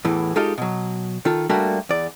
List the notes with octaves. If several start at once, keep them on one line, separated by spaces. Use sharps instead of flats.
E2 A2 E3
G#3 D#4 F4 G4 A4 F5
B2 F#3
D#3 F4 A4
G3 A3 A#3 D4 F#4
E2 D5